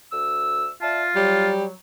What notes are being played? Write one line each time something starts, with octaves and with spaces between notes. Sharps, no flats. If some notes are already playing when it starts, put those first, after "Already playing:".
D2 E6
F4 D5 E5 A5
F#3 G3